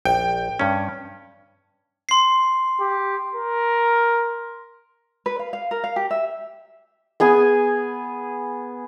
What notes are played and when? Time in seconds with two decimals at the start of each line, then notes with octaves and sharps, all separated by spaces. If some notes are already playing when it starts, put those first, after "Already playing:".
0.05 A#1 G5
0.59 G2 C#4
2.09 C6 C7
2.80 G4
3.35 A#4
5.26 B4
5.39 F5
5.53 F5
5.71 A#4
5.84 F5
5.96 G4
6.11 E5
7.20 B3 G#4 G#5